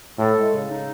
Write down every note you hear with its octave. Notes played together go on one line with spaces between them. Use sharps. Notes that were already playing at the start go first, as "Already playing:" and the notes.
A2 A4
G#3
C#3
D#4